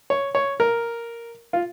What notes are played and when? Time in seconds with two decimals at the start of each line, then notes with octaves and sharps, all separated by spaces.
0.10 C#5
0.35 C#5
0.60 A#4
1.53 F4